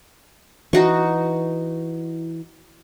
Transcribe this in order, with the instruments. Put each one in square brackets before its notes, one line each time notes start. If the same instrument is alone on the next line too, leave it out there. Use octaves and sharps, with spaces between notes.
[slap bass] E3 [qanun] D#4 F#4 C#6